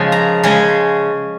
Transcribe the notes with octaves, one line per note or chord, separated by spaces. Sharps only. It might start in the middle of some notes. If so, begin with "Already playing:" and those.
Already playing: C#3 F3 G#3 C#4 G#5
A#5
C#3 G#3 C#4